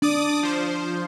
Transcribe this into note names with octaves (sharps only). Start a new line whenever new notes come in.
D4 D5 D6 D#6
F3 C5